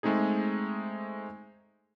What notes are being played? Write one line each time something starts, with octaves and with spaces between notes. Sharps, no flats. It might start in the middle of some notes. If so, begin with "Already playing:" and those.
G#3 A3 C4 D#4 G#4